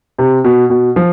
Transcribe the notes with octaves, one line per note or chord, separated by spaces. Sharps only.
C3
B2
B2
F3